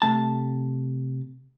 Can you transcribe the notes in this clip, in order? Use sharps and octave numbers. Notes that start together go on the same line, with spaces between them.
C3 A3 A5